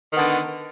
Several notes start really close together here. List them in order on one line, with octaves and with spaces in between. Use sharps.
D#3 B3 D3